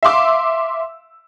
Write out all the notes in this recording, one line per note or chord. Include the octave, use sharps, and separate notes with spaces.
E5 F5 C6 D6 E6